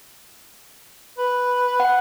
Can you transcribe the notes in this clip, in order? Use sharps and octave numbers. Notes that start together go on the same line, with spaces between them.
B4
F#5